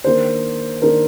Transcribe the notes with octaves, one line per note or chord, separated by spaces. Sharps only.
D#3 A#3 D4 C5
D#3 A#3 D4 A#4